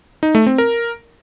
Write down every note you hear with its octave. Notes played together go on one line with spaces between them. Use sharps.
D#4
A3
C4
A#4